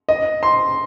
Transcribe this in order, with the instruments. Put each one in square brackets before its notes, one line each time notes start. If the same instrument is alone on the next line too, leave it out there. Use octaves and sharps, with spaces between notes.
[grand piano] D#5
C6